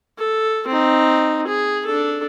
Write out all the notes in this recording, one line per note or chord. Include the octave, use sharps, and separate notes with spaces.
A4
C4 D#4
G#4
D4 A4